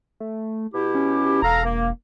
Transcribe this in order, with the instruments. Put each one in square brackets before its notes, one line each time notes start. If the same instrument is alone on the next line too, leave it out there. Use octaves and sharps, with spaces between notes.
[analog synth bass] A3
[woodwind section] B2 E4 G4
[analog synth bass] C#4
[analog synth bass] E1 [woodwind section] A4 F5 A#5
[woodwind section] A#3